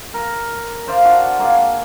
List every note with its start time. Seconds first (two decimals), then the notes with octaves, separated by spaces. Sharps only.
0.14 A#4
0.87 C5 D5 F5
1.04 D4 F#4 F#5 A5
1.39 A#3 G#4